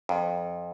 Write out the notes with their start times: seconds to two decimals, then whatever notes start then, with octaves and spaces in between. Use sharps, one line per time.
0.09 F2